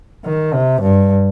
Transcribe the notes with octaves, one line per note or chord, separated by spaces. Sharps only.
D#3
C3
G2